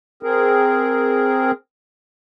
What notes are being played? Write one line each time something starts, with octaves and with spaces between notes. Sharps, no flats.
C4 G#4 A#4